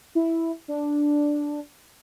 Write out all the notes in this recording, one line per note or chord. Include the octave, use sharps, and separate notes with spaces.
E4
D4